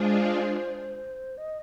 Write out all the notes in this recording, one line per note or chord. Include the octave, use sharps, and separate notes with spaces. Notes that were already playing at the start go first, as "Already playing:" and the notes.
Already playing: G#3 D4 F4 G#4 C5
D#5